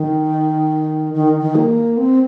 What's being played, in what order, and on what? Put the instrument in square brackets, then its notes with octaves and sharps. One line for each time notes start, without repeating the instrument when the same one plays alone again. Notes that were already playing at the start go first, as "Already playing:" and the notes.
Already playing: [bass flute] D#3
D#3
D#3
A#3
C4